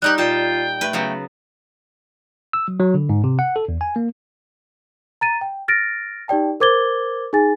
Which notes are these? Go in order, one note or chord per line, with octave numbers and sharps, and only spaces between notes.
G3 D#4 G4 F#6
A#2 F4 G5 A5
A3 B4
C#3 F#3 B3
E6
F#3
F#3
D3
G#2
C3
F#5
A4
E2
G#5
A#3
A#5 A6 D#7
G5
F6 A6 A#6 D7
D#4 G4 D5 G5 A5
A#4 C5 D6 G#6 A6 G7
D#4 G#4 G#5 A6